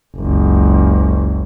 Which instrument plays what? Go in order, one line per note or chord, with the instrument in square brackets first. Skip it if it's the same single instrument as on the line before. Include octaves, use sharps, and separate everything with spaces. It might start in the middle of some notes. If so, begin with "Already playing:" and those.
[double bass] F#1 C#2